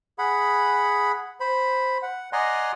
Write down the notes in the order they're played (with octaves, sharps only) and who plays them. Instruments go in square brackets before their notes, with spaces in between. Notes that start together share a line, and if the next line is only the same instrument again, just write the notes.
[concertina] G#4 F#5 B5
C5 B5
F#5
D5 D#5 F#5 G#5 A#5 C6